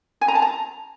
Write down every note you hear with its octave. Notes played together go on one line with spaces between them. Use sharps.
G#5
A#5
A5
A#5